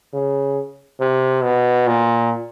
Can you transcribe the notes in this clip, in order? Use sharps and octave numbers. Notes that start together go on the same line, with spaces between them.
C#3
C3
B2
A#2